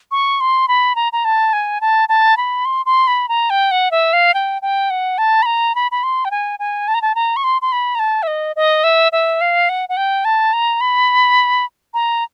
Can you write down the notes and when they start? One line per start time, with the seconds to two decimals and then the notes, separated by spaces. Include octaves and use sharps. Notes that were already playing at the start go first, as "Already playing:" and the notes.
0.11 C#6
0.40 C6
0.68 B5
0.95 A#5
1.12 A#5
1.24 A5
1.53 G#5
1.81 A5
2.09 A5
2.37 B5
2.65 C6
2.86 C6
3.07 B5
3.29 A#5
3.50 G5
3.71 F#5
3.91 E5
4.13 F5
4.34 G5
4.62 G5
4.90 F#5
5.18 A5
5.42 B5
5.46 A#5
5.75 B5
5.91 B5
6.03 C6
6.25 G5
6.31 G#5
6.59 G#5
6.88 A5
6.94 A#5
7.02 A5
7.15 A#5
7.36 C#6
7.44 C6
7.62 C6
7.72 B5
7.95 A#5
7.99 A5
8.23 E5
8.27 D#5
8.56 D#5
8.84 E5
9.12 E5
9.41 F5
9.69 F#5
9.89 F#5
9.97 G5
10.25 A5
10.53 A#5
10.81 B5
11.94 A#5